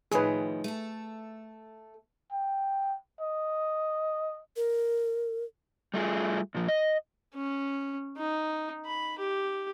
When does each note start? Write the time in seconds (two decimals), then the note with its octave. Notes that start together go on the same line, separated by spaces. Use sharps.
0.11 A2 D#3 F3 G#4 B4
0.64 A3 A4
2.32 G5
3.21 D#5
4.56 A#4
5.94 G3 A3 F4 G#4
6.55 A#2 F3
6.68 D#5
7.35 C#4
8.18 D#4
8.86 B5
9.19 G4